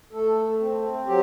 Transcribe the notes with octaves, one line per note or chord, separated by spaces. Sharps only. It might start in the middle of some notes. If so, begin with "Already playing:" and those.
A3 A4
C4
F#3 G4